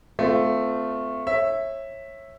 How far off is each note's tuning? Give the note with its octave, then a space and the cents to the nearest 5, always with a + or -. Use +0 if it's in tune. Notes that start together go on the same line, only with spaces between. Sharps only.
A3 +0 C4 -30 F4 +0
C#5 -25 E5 +0